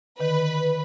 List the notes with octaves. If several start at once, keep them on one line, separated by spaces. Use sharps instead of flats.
D3 D#3 B4